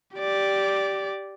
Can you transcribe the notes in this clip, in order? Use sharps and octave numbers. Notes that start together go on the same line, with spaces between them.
G4 D5